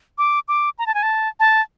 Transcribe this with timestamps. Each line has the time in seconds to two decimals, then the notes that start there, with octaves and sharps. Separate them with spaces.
0.18 D6
0.48 D6
0.79 A#5
0.87 A5
0.94 G#5
1.03 A5
1.40 A5